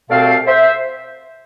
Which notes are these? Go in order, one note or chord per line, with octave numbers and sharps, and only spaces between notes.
C2 B2 A3 C4 D5 F5
C5 E5